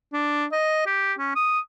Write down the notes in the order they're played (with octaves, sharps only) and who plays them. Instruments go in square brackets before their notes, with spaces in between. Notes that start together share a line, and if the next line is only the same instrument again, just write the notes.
[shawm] D4
D#5
G4
C#4
D#6